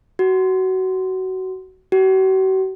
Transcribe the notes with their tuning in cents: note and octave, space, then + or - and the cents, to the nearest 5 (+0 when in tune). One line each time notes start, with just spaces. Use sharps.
F#4 +20
F#4 +45